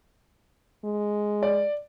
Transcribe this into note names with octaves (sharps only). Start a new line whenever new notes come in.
G#3
D5